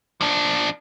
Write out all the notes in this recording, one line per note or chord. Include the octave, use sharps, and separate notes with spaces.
F3 D4